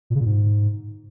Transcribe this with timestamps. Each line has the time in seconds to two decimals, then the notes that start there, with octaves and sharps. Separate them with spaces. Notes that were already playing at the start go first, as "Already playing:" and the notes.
0.10 A#2
0.15 C#3
0.20 A#2
0.25 G#2